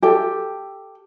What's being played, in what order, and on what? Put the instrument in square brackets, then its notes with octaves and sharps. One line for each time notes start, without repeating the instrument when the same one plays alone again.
[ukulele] G4 A4 G5